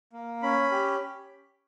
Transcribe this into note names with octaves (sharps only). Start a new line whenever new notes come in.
A#3
C#4 B5
G4